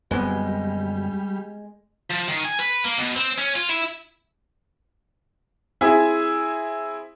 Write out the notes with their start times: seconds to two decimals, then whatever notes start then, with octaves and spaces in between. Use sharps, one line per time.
0.11 F#2 B2 D3 G3 G#3 B3 C4 B4
2.11 F3
2.29 D#3
2.45 G#5
2.59 B4
2.84 A#3
2.98 B2
3.15 C4
3.38 C#4
3.55 F4
3.69 E4
5.81 C4 E4 G#4 E5